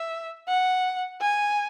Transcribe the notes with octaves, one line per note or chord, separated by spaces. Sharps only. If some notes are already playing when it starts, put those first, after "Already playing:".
Already playing: E5
F#5
G#5